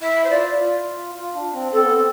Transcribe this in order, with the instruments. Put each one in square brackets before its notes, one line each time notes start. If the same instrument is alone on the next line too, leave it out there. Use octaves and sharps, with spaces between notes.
[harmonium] E4 [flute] E5
[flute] C5
[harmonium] F4 [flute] D5
[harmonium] F4
F4
D4
C4
[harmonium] C4 [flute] A4
[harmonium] B3
C4